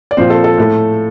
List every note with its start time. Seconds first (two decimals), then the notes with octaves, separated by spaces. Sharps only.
0.11 D5
0.17 A#2 F3 C4 C5
0.30 A4
0.44 A4
0.58 A2 A3